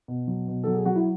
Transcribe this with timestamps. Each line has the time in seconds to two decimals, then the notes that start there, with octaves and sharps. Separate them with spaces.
0.08 B2
0.28 F#3
0.48 B2
0.64 F#3 A4
0.74 G#4
0.85 F#3 F#4
0.96 E4